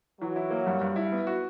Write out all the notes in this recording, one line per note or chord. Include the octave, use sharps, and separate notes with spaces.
E3 F#3
E4
A#3
G2
G2
E4
B3
F#4